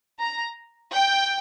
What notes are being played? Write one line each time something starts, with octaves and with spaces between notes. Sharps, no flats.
A#5
G5